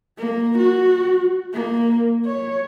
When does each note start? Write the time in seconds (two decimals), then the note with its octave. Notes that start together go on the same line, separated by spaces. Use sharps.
0.18 A#3
0.58 F#4
1.54 A#3
2.26 C#5